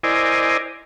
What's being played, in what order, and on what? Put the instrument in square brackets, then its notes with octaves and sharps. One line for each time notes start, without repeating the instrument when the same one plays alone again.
[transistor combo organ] E4 A#4 C5 D5 D#5 G#5